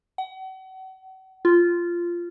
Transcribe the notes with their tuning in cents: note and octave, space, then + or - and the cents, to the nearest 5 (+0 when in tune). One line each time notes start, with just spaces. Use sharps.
F#5 +40
F4 -10